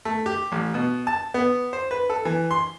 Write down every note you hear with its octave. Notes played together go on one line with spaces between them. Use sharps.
A3
G4
A1
B2
A5
B3
C5
B4
A4
E3
C6